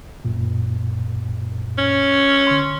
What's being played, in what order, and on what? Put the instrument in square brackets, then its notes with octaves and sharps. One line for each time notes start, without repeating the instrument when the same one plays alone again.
[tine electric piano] F#2 A#2
[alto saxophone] C#4
[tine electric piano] D3 C6